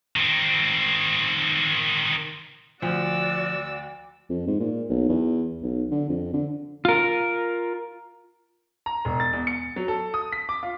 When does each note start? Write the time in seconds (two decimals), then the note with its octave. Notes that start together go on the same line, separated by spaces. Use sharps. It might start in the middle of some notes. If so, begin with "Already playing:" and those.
0.16 D#3 C4
2.82 D2 F3 F#4 D5 E6
4.29 F2
4.48 G#2
4.60 A#2
4.90 B1
5.09 E2
5.62 B1
5.91 D3
6.09 F2
6.33 D3
6.85 F4 A#4
8.86 A#5
9.05 E1
9.20 A6
9.33 E2
9.47 C#7
9.76 F#3
9.88 A4
10.14 D#6
10.32 B6
10.49 D6
10.63 F4